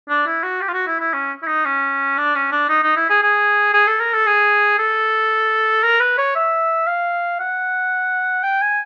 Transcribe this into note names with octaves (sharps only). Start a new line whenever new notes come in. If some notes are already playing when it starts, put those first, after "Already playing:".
D4
E4
F#4
G4
F4
F#4
E4
E4
C#4
E4
D#4
C#4
D4
C#4
D4
D#4
D#4
E4
G#4
G#4
G#4
A4
A#4
A4
G#4
A4
A#4
B4
C#5
E5
F5
F#5
G5
G#5